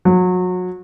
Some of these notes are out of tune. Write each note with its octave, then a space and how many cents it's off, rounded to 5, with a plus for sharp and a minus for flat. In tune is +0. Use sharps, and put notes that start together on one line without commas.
F#3 -30